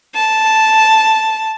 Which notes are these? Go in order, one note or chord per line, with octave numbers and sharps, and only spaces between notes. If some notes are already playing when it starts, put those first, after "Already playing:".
A5